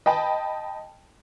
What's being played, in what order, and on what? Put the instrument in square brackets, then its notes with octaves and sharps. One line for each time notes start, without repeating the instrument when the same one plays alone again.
[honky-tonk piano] D#5 G5 A5 B5